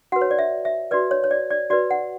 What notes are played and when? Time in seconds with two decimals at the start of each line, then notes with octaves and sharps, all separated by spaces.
0.12 F#4 B4 F#5
0.21 C#5
0.31 D5
0.39 E5
0.65 E5
0.91 F#4 B4 D5
1.11 C#5
1.24 C#5
1.31 D5
1.50 D5
1.70 F#4 B4 D5
1.91 F#5